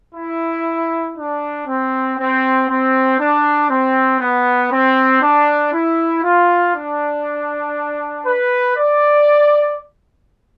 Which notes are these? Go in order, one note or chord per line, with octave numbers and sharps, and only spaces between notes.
E4
D4
C4
C4
C4
D4
C4
B3
C4
D4
E4
F4
D4
B4
D5